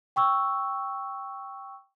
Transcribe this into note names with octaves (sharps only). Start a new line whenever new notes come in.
G5 C#6 E6